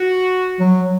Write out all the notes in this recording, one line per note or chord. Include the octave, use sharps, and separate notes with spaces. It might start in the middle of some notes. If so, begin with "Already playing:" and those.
Already playing: F#4
F#3